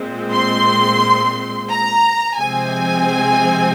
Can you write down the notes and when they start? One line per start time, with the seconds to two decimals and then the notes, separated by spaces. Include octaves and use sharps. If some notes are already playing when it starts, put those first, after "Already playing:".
Already playing: A#2 G#3 C4
0.33 C6
1.70 A#5
2.38 C3 F3 G#3 C4 G#5